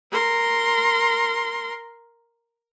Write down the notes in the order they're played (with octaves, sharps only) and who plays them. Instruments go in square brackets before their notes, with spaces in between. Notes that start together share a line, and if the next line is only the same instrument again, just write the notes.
[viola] A#4 C6